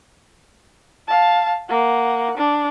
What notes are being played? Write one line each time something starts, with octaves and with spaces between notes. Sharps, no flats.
F5 A5
A#3 F#5
D4